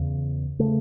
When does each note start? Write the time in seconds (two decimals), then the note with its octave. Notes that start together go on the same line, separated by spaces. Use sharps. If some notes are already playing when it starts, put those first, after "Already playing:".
Already playing: E2 C#3
0.59 C#3 A3